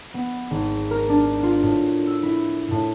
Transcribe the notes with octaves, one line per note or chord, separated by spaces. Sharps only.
B3
G#1
A#4
D4
F4
A2
E6
E4
A2